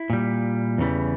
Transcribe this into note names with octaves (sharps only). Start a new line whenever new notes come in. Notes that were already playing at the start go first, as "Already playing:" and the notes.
Already playing: E4
A#2 G3
E2 C#3 E3 G3